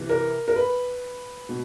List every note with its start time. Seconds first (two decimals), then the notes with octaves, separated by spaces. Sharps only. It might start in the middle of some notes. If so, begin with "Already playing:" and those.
Already playing: C3 E3
0.09 A#4
0.48 A#4
0.56 B4
1.49 B2